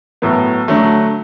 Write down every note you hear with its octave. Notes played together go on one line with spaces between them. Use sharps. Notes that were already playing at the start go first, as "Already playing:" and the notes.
A2 F#3 B3
D3 F#3 A3